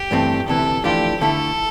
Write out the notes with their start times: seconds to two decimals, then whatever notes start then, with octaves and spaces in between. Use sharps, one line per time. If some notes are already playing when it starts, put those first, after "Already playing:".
Already playing: G4
0.11 G2 E3 A3 C4
0.48 D2 C3 E3 A4
0.84 F2 E3 A3 D4 F4 G4
1.21 D3 A3 E4 A4